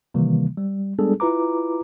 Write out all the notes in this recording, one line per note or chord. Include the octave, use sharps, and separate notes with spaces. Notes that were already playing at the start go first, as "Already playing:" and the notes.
C3 D#3 E3 G3 A#3
G3
G3 G#3 B3 D4 G#4 A4
E4 F4 B4 A#5 D6